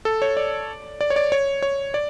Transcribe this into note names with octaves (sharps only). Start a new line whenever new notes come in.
A4
C#5
D5
D5
C#5
D5
C#5
C#5
D5